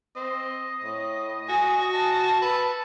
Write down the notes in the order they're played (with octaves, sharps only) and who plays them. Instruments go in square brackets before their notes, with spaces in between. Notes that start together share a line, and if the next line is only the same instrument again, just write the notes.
[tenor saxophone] C4 [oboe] D#5
[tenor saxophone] A2
[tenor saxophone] F#4 [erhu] G#5
[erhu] A5
[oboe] A4 [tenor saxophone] B4